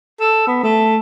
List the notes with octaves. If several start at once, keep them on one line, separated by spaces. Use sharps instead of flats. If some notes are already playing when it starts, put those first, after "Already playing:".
A4
B3
A3